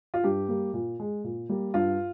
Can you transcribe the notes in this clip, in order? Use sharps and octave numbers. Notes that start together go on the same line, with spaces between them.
F4
G2 G4
G3 A#3
A#2
G#3
A#2
G3 A#3
G2 F4